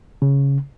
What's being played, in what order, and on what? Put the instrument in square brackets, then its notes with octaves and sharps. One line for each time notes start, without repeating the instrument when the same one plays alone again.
[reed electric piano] C#3